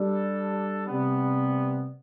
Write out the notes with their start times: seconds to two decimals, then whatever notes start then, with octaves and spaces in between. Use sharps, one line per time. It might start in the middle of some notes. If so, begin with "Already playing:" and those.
Already playing: G3 D4 A4
0.87 C3 G3 B3